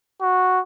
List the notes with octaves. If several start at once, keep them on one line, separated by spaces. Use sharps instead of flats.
F#4